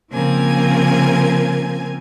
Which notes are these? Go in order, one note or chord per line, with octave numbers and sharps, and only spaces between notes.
C#3 F3 A#3 C4 A#4 G#5